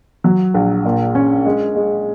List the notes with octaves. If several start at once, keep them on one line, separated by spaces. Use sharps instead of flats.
F#3
A#1
A#2
C#4
G#3
G#3